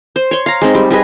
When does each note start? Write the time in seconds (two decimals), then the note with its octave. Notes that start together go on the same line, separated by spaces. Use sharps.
0.16 C5
0.31 C#5 C6
0.46 F5 A#5
0.62 G#3 C4 D#4
0.75 G3
0.90 G3 G#4 B4 D#5